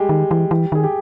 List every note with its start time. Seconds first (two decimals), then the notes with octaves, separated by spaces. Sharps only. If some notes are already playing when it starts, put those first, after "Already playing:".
Already playing: G3 G#3 G4 G#4
0.09 D#3
0.31 E3
0.51 E3
0.72 D#3 G#4
0.83 G4